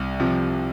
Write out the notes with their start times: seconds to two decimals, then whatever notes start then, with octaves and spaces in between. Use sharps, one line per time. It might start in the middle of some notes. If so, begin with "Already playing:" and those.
Already playing: C2
0.20 C3 F3